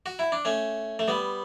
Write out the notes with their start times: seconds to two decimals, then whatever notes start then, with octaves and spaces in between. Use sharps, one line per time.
0.06 F#4
0.19 E4
0.32 D4
0.45 A3 C#4
0.99 A3
1.08 G3 B3